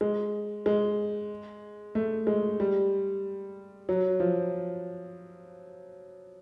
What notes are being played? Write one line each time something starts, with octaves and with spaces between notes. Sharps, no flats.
G#3
G#3
A3
G#3
G3
F#3
F3